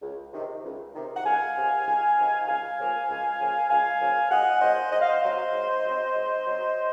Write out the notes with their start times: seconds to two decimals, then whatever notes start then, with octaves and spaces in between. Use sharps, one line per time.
0.02 C#2
0.33 C3 D#3
0.64 C#2
0.95 C3 D#3
1.16 F#5
1.25 C#2 F5 G#5
1.56 C3 D#3
1.86 C#2
2.17 C3 D#3
2.47 C#2 F5 G#5
2.78 C#3 F3 A#3
3.09 C#2
3.39 C#3 F3 A#3
3.70 C#2 F5 G#5
4.00 C#3 F3 A#3
4.31 C#2 D#5 F#5
4.61 C#3 F3 A#3 C5 D#5
4.92 G#2 D#5
5.01 F5
5.09 C5 D#5
5.23 F#3 C4
5.53 G#2
5.84 F#3 C4
6.15 G#2
6.46 F#3 C4